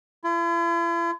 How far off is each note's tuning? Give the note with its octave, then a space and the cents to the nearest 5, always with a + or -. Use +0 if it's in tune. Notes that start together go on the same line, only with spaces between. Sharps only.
E4 +45